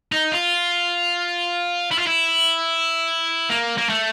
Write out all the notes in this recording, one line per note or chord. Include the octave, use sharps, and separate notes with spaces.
D#4
F4
E4
F4
E4
A#3
A#3
A3